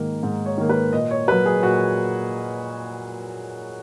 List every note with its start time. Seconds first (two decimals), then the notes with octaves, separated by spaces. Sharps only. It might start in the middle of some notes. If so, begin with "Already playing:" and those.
Already playing: G#2 D#3 A#3
0.23 G#2
0.46 C#5
0.58 D#3 A#3
0.69 B4
0.93 A#2 D#5
1.11 C#5
1.28 F#3 A#3 B4
1.46 G#4
1.62 A#2 F#4